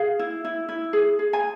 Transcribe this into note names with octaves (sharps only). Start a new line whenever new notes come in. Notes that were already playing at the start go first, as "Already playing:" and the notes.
Already playing: G#4 F5
E4
E4
E4
G#4
G#4
G#5